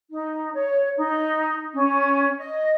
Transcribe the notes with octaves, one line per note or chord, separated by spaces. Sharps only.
D#4
C#5
D#4
C#4
D#5